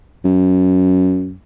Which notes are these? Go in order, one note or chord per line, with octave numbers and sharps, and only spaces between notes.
F#2